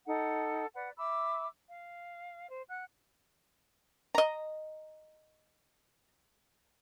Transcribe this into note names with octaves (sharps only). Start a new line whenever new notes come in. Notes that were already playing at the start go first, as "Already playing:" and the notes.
D#4 A4 F#5
B4 D5 F#5
E5 B5 D6 E6
F5
C5
F#5 F#6
D#5 A#5